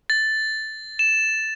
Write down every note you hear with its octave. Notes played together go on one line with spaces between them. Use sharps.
A6
E7